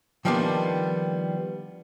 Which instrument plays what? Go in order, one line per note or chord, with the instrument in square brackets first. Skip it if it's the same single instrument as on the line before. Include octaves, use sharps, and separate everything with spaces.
[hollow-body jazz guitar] D#3 F3 G3 A#3 B3 D4